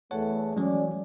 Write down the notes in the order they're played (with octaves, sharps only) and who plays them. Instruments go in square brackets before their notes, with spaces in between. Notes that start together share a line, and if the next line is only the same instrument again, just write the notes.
[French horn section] E2 A3 [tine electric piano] C#5 F#5 A5
[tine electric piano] E3 F#3 G#3 [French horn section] C#4 D5